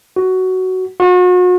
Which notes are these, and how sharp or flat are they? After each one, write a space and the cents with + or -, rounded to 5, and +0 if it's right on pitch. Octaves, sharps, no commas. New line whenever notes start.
F#4 +10
F#4 -40